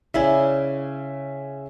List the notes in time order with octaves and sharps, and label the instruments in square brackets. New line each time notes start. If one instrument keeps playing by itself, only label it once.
[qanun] C#3 E4 D5 [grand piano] E5 G#5